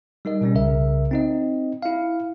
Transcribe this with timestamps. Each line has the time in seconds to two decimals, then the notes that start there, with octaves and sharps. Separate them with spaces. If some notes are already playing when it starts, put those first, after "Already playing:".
0.25 G3 D#4 A#4 D#5
0.41 B2 G3 C#4
0.55 C2 C#3 A#4 E5
1.11 C4 D#4 D#5
1.83 E4 F5